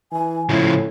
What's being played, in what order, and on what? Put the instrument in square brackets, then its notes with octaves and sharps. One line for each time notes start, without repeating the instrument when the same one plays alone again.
[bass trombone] E3 [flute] G#5
[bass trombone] A2 [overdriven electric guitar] C#3 F3 [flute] E4